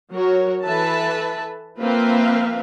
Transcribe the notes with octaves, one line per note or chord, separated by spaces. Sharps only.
F#3 F#4 A#4 C#5
E3 A4 B4 E5 A5
F3 A#3 C4 B4 E5 F5